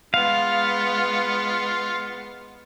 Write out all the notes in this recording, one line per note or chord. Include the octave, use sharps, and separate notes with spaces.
G#3 B3 F4 F5